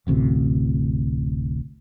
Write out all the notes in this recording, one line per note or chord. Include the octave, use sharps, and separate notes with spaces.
D1 A1 D2 C3